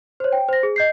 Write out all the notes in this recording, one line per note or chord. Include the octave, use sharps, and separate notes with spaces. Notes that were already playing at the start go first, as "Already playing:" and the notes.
C5 C#5
G5
C5 A#6
G#4
D#5 G6 C7